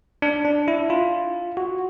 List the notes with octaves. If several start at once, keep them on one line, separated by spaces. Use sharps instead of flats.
D4
D4
E4
F4
F#4